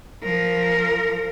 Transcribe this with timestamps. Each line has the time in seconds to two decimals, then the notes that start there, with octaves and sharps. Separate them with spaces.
0.23 F3 A#4